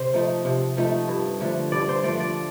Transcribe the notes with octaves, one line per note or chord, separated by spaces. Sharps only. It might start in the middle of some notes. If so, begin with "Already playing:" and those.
Already playing: C3 C5
F3 A3 D#4
C3
F3 A3 D#4
G2
D3 F3 A3
G2 D5
C5
D3 F3 A3 D5
D5